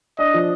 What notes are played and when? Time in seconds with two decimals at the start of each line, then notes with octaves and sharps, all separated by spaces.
0.19 D4 D#5
0.34 F3